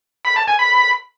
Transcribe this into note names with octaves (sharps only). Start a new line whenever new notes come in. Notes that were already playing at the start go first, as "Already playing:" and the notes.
B5
A5
G#5
B5